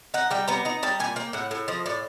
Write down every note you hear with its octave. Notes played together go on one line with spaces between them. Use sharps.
D#4 F#5
G3 G5
B3 A#5
D#4 A#5
G3 A5
A#2 G#5
A#3 G5
A2 F#5
A2
F3 D#5
A2 D5